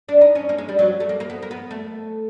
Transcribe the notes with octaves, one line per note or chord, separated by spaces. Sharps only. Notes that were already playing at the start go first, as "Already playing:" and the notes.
D4
D#4
C#4
A#3
G#3
G3
F#3
A3
A#3
A#3
B3
A#3
B3
A3